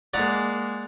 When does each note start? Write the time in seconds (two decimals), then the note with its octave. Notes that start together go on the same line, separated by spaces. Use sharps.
0.14 G#3 A#3 D5 F#5 A#5